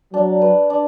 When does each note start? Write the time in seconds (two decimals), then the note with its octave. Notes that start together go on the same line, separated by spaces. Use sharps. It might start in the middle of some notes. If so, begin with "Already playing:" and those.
0.13 F#3 D4
0.42 B4
0.70 D4